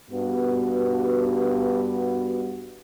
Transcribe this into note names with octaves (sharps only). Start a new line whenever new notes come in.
G2 B3 F#4